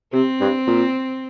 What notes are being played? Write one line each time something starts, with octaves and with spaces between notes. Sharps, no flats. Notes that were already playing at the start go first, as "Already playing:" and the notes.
C3 C4
G2
A#2